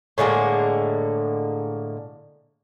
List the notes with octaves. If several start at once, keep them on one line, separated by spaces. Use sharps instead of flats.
A2 D3 G#3 A#3